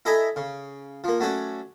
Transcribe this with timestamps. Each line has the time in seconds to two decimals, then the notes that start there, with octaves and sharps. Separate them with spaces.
0.05 E4 A4 D#5 E5 G#5 A#5
0.36 C#3
1.04 F3 A#3
1.20 F#3 A3 C#4 F#4 D5